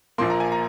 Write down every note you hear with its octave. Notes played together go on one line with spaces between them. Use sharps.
A#1 A#2 F3 A#3 C6
A#5
G#5
A#5